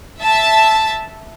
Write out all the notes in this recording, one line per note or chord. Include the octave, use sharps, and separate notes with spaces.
E5 A5